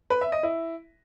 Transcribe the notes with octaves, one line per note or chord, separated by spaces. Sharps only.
B4
E5
D#5
E4